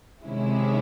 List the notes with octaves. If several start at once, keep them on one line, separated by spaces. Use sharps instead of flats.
C3 D#3 G#3 C#4 E4